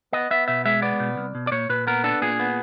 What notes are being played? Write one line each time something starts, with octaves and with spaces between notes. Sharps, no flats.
B3 D#5
B3 E5
B2 E5
G#3 E5
B3 D5
B2
C2
B2
D5
A#2 C#5
A#2 B4
B3 A#4
D4 A4
A#2 G#4
B3